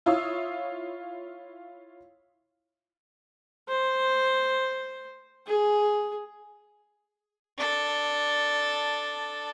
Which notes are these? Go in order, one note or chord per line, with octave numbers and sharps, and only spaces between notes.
E4 F4 C#5 F5 D#6 E6
C5
G#4
D4 A4